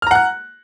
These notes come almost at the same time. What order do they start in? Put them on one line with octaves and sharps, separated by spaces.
F6 A#5 F#5 F#6